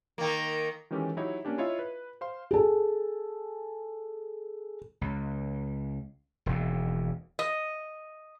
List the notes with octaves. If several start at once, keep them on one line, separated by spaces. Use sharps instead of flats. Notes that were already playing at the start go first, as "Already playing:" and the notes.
D#3 A#3
D#3 E3 G#3 C#4 G4 A4
F#3 D#4 E4 G4 C#5 D#5
A#3 C#4 D4 G4
E4 F4 C#5 D#5 E5
B4
C5 F5 C6
G#4 A4
C#2
E1 D#2
D#5